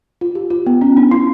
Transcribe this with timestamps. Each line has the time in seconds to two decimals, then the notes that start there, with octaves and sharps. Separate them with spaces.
0.21 F4
0.35 G4
0.50 F4
0.66 B3
0.81 C#4
0.97 D4
1.11 E4